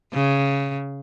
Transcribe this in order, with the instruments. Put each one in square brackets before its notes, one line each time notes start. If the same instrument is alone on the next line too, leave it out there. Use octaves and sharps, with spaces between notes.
[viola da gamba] C#3